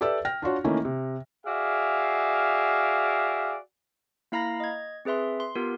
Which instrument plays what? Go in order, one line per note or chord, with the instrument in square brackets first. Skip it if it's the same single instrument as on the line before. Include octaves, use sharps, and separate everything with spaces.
[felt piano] G4 A4 B4 D5 E5 E6
G5 F6 A#6
D4 F4 F#4 C#5
D#3 E3 A3 A#3 C#4 E4
C3
[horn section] F#4 G#4 D5 E5 F5
[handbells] A#3 E4 F5 A#5 B5 A#6
D#5 G#6
C4 G#4 B4 E5 C6
C6
B3 F4 G4 A#4